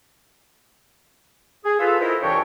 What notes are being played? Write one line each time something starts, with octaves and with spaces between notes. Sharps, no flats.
G#4
F4 A4 B4
E4 F4 A#4 C5 D#5 E5
C2 E3 D4 C#5 G5 C#6